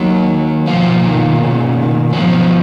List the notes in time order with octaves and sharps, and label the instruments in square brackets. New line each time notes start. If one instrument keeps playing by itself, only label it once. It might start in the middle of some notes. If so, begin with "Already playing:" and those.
Already playing: [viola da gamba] F#3 [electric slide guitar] A#3 D#4 A#4
[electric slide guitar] B2 A#3 F4 B4 F5 [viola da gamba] F3
[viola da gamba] D#3
C#3
D#3
[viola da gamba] F3 [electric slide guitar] F#3 B3 F4 B4